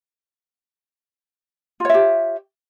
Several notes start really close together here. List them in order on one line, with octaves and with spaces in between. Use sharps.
F4 C#5 E5 G4